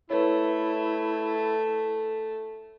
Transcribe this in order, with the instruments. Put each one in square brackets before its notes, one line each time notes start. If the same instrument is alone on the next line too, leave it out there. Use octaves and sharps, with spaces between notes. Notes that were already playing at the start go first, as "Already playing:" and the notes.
[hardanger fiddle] A3 [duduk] E4 [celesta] B4 C#5